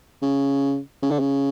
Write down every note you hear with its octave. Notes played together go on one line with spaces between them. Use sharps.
C#3
C#3
D3
C#3